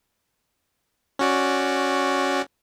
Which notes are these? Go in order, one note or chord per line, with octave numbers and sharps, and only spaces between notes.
C#4 F#4 D5